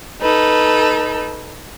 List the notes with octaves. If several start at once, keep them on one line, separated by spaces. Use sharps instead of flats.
D#4 A4 B4